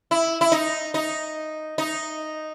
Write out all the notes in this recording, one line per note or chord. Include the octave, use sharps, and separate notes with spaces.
E4
E4
D#4
D#4
D#4